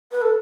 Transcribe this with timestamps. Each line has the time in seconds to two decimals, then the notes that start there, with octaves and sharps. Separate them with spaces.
0.11 B4
0.22 A4